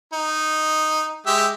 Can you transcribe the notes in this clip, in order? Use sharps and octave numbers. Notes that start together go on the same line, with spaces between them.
D#4
G#3 G4 E5